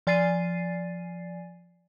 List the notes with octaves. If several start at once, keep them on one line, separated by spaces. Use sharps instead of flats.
F3 D5 G#5 A6 C7 D#7